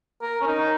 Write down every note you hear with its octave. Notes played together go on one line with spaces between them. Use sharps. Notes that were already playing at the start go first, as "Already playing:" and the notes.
A#4
C#4
D#4